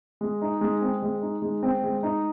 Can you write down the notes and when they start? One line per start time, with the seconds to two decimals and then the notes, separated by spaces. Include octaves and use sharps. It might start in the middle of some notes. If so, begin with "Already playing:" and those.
0.21 G#3
0.42 D#4
0.61 G#3
0.82 C4
1.02 G#3
1.22 D#4
1.42 G#3
1.63 C4
1.83 G#3
2.03 D#4